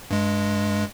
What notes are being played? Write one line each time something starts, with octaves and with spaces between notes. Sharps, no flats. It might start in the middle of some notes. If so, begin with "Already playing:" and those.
G2 G#3